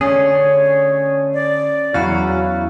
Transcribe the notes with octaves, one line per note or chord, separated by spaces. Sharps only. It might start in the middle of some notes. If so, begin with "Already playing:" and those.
D3 A3 C#4 G#4 C#5
D5
E2 F#3 C#4 E4 F#4 F5